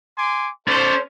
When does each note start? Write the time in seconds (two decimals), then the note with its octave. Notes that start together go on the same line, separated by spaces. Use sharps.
0.18 G#5 C6 D6
0.68 C#4 A4 C5 D5